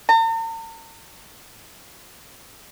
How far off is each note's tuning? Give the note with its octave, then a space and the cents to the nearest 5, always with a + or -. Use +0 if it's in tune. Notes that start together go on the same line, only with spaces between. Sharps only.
A#5 -45